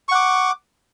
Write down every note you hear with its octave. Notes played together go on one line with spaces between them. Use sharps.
F#5 C#6 D6